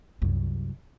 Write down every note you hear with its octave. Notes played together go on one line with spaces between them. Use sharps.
C2 F#2